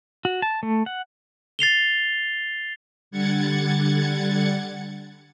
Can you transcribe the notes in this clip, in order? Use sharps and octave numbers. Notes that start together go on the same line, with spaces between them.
F#4
A5
A3
F#5
A6 C7 F7 G7
D3 G3 F#5 G#6 A6 C#7